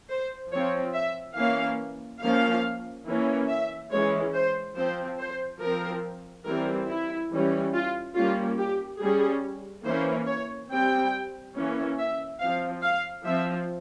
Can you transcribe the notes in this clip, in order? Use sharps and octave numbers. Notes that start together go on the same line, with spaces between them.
C5
F3 C4 C#5
E5
E3 A#3 C#4 F5
F3 A#3 C#4 F5
E3 A#3 C#4
E5
E3 G#3 C#4 C#5
C5
F3 C4 C5
C5
F3 C4 A#4
E3 G3 C4 A#4
E4
E3 G3 C#4
F4
G3 A#3 C#4 F4
G4
G3 C#4 G#4
E3 A#3 C#4 C5
C#5
G3 C4 G5
E3 A#3 C#4
E5
F3 C4 F5
F5
F3 C4 E5